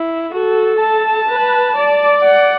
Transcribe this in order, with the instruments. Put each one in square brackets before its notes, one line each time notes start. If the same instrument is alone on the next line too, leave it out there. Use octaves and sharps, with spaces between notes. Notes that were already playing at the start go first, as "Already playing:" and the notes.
Already playing: [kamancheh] E4
[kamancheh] F#4 [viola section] A4
[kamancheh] A5
[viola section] B4
D5
[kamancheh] F#5